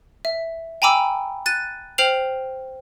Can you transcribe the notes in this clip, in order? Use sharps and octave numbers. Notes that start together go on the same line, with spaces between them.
E5
G5 G#5 A#5 B5 D6 E6
F#6 A6 D#7
C5 G5 F6 C7 F7 F#7